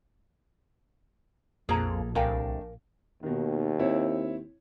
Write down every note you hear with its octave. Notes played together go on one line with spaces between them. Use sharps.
A#1 F2 A#3 G#4 A4 A#5
C2 A3 D4 A#4 F5 G5 G#5
D#2 B2 D#3
C4 E4 C#5